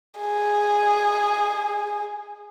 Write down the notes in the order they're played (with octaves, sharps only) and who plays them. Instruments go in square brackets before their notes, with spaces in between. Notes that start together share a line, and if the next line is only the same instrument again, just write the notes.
[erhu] G#4